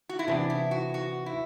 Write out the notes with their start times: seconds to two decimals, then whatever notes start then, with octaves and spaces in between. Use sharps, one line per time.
0.09 F#4
0.19 E4
0.27 C3 E3 B3 D4
0.50 E4
0.71 F#4
0.94 F#4
1.26 E4